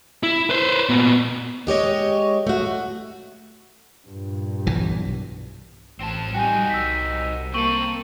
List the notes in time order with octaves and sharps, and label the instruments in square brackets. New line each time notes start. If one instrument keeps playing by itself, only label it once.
[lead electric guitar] E4
B4 C5
A#2 B3
[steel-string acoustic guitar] G#3 G4 C#5 D#5
A3 F#4
[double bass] G2 A#2
[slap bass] B1 E3
[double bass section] A1 [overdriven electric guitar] C4 A5
[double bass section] G3 [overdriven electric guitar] D#4 F#4 [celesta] G5 G#5
[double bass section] C2 [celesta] E6 B6
[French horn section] A#3 [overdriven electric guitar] C4 A4 [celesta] C#6 D#7 F#7